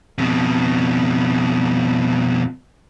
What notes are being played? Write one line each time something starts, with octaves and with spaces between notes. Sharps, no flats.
F2 B2